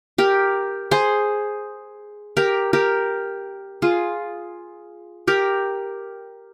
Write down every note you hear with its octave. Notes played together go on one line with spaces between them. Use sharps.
G4 A#4
G#4 C5
G4 A#4
G4 A#4
F4 G#4
G4 A#4